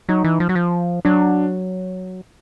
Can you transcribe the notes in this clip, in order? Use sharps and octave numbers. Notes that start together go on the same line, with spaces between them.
F#3 D#4
E3
F3
F#3
F3
F#3 D4